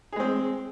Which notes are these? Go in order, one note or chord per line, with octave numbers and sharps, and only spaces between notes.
G#3 C4 G#4